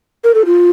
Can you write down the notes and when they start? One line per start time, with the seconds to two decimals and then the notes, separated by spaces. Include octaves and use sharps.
0.24 A#4
0.34 A4
0.46 F4